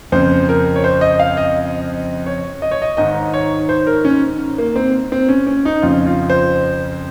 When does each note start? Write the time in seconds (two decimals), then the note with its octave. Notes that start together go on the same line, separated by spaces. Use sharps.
0.12 F2 C#3 C5
0.49 A#4
0.76 C#5
0.84 C5
1.01 D#5
1.19 F5
1.37 D#5
2.26 C#5
2.62 D#5
2.71 C#5
2.82 D#5
2.97 G#2 D#3 D#5
3.34 C#5
3.69 C5
3.87 A#4
4.05 C#4
4.58 A#3
4.76 C4
5.12 C4
5.29 C#4
5.47 C#4
5.65 D#4
5.82 F2 C#3 F4
6.06 F4
6.30 C5